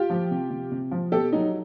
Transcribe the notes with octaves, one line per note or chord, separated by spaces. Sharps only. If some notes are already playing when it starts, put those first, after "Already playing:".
Already playing: F4 G4
F3
C3
C3
C3
F3
B2 G4 A4
F#3 D#4